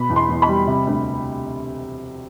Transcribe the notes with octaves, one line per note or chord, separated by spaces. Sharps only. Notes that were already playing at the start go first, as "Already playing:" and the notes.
Already playing: B2 B5
E2
C6
E2
B5
G3
C3
D2